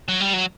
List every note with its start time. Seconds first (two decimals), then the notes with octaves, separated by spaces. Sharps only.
0.08 F#3
0.21 G3
0.33 F#3